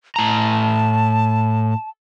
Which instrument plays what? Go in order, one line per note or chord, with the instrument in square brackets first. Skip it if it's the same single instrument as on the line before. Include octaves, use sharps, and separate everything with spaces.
[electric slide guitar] A2 A#5 [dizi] A5